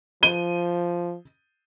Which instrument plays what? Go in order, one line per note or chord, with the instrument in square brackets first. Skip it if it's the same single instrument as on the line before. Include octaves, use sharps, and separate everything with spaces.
[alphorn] F3 [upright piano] D#7 G7